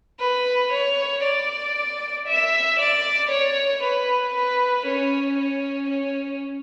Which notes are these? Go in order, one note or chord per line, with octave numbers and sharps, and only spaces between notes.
B4
C#5
D5
E5
D5
C#5
B4
B4
C#4
C#4
C#4